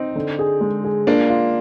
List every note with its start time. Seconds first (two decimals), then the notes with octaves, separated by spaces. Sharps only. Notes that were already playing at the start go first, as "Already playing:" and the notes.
Already playing: C4 D#4
0.16 D3
0.39 G#4
0.61 G#3
0.84 G#4
1.07 A#3 D4 F4
1.29 F4